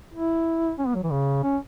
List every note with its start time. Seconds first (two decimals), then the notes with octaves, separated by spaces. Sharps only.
0.14 E4
0.79 C#4
0.87 B3
0.95 F#3
1.03 E3
1.10 C#3
1.43 C#4